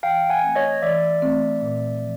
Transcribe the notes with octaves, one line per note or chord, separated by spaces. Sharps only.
E3 F5 G5
F#5 G#5
A3 C4
C#5 D#5
E3 D5 E5
A3 C4
A#2
F3